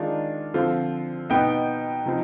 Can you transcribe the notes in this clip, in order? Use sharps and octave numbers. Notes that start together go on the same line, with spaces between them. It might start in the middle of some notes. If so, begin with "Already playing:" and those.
Already playing: D#3 G#3 D4 F4
D3 F3 C4 F4
B2 B3 D#4 G5
C3 F3 C4 D#4